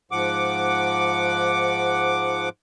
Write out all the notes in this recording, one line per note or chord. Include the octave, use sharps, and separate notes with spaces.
G#2 F3 F#5 D6